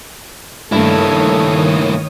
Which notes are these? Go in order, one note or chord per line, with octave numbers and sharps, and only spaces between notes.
G2 D#3 A3 A#3 E4 A4 C#5 D#6